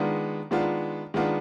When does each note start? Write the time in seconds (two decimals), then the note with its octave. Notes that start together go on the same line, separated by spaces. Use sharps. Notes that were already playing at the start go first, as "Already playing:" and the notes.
Already playing: D#3 G#3 B3 D4 F4
0.51 D#3 G#3 B3 D4 F4
1.14 D#3 G#3 B3 D4 F4